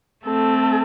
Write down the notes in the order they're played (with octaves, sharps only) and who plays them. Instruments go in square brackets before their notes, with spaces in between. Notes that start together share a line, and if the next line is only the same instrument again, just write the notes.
[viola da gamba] A3 C4 [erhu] A4